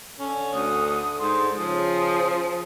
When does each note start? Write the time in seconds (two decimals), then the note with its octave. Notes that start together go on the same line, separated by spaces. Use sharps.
0.19 D3 C#4 A4
0.54 D2 D#6
1.19 G#2 C6
1.57 C#3 F3 G#4 D#6